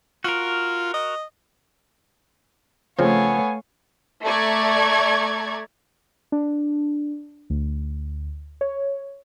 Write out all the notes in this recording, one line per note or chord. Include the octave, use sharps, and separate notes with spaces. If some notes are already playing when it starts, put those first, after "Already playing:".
F4 F#4 A#4
D#5
C#3 F3 A3 B3 C4 C#5 F5 G#5
A3 D5 A#5 C#6 G#6
D4
D2
C#5